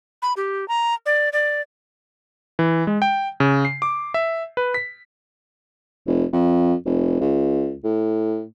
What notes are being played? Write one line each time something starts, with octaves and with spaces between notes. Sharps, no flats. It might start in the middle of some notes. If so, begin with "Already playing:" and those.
B5
G4
A#5
D5
D5
E3
G#3
G5
C#3
C7
D6
E5
B4
B6
F1
F2
F1
C#2
A2